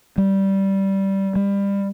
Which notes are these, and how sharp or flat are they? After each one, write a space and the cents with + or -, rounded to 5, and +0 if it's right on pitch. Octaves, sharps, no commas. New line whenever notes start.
G3 -15
G3 +25